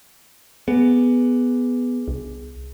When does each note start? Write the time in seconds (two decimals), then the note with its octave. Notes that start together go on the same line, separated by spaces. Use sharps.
0.68 B3 G#4
2.08 C2